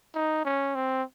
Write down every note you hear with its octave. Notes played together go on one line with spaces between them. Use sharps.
D#4
C#4
C4